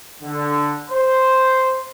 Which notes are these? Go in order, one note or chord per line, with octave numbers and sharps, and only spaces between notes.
D3
C5